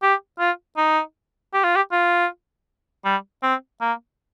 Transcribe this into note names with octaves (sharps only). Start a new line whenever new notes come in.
G4
F4
D#4
G4
F4
G4
F4
G3
C4
A#3